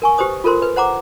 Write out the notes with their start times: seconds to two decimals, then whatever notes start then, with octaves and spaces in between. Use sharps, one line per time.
0.02 A#4 G#5 C#6
0.18 G4 B4 C5 D#6
0.44 F4 A4 A#4 C5 C6
0.62 B4
0.76 C5 F#5 A#5 D6